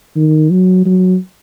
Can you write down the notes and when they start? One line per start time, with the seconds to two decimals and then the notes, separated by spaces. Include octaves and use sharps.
0.16 D#3
0.51 F#3
0.85 F#3